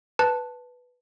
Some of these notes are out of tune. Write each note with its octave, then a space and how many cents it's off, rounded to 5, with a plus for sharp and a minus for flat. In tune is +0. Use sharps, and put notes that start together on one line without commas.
B4 +0 A5 +0